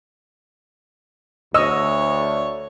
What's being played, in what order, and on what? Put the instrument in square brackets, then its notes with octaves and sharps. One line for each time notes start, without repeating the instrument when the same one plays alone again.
[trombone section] D2 [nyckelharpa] C#5 [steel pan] D#5 [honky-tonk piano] E6